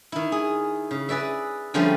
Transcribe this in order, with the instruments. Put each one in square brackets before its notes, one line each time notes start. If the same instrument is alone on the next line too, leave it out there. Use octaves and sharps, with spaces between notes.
[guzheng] D#3 E4
G#4
C#3
G#4 B4 D5 E5
D3 F3 G3 A3 C#4 C5